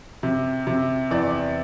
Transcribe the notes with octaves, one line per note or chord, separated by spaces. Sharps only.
C3
C3
E2 D5